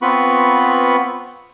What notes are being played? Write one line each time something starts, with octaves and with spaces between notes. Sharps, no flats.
B3 C4 F4 B4 B5 C#6